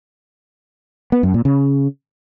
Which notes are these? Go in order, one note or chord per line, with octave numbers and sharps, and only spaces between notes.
B3
F#2
A#2
C#3